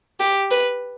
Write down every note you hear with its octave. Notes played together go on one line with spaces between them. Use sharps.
G4
B4